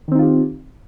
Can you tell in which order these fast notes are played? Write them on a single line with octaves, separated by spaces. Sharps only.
D#3 C4 D#4 F4 G4